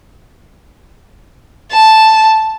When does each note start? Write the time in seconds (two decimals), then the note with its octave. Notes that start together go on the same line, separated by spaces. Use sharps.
1.72 A5